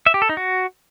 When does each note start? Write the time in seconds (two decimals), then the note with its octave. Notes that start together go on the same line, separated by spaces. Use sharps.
0.06 E5
0.14 G4
0.22 A4
0.29 D#4
0.37 F#4